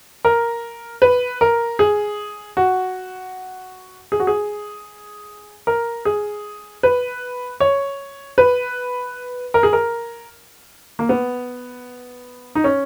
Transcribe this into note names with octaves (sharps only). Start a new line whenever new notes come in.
A#4
B4
A#4
G#4
F#4
G#4
F#4
G#4
A#4
G#4
B4
C#5
B4
A#4
G#4
A#4
A#3
B3
D#4
C#4